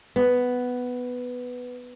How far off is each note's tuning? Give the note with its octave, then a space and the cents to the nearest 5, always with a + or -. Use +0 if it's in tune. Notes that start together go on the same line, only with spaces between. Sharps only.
B3 +5